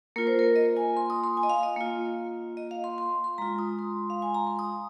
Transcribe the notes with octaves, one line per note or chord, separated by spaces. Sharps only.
A#3 F4 A#4
C5
A#4
D#5
G#5
C6
D#6
C6
G#5
D#5
F5
D#5
A#3 F4
D#5
F5
C6
C6
C6
G#3 F4 A#5
D#6
C6
F5
G#5
A#5
C6
D#6